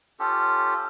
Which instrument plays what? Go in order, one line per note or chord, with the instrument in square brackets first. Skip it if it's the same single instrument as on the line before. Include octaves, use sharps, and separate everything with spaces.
[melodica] C#4 F4 G4 A4